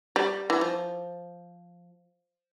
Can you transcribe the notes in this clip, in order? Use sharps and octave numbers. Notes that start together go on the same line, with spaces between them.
G3
E3
F3